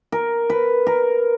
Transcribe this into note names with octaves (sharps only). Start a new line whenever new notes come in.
A#4
B4
A#4